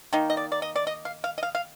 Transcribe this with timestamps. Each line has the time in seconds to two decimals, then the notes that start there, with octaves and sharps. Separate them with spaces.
0.13 D#3 A#3 D#4
0.30 D#5
0.37 D5
0.52 D5
0.62 D#5
0.76 D5
0.87 D#5
1.05 F5
1.24 F5
1.38 D#5
1.43 F5
1.55 F5